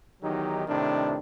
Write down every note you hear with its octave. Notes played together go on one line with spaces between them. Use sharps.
E2 D#3 F#3 D#4 G4
A2 C3 D#3 D4